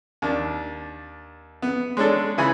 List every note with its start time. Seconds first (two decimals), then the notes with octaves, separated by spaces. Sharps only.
0.22 D#2 D4
1.62 B3
1.97 G#3 C#4 D4 A4
2.38 C#3 E3 G#5 B5